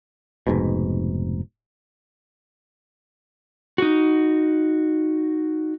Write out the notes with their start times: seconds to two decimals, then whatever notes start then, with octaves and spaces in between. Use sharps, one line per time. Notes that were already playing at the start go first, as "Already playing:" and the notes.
0.47 F1 G#2 B2
3.78 D#4 F#4